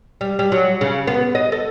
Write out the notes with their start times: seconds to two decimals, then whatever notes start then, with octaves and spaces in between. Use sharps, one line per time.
0.21 G3
0.39 G3
0.52 F#3
0.81 C#3
1.07 B3
1.35 D#5
1.52 A4